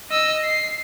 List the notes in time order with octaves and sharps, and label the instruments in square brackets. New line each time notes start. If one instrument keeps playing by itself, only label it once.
[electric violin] D#5 E6
C7